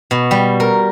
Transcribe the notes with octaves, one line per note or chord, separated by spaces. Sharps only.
B2
G3
A#4